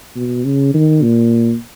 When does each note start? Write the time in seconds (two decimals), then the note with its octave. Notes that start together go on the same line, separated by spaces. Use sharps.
0.16 B2
0.45 C#3
0.74 D#3
1.02 A#2